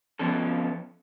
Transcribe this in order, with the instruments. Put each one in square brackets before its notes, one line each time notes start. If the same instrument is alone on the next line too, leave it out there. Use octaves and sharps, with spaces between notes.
[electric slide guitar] F2 F3 B3 C#4 A4